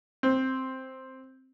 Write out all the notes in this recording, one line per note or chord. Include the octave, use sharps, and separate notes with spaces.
C4